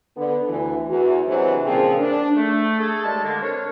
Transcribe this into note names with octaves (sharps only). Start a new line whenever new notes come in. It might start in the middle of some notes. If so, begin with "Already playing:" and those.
D3 B3
D2 E3
E2 F#4
C3 E3 F#3 G#3 D4 C5
A#2 C#3 F3 A#3 C4 G#4
D4
A3
A3 G#4 A4
D#2 G#3 D5 A5
D3 G#3 A#3
C4 D4 A#4 C#5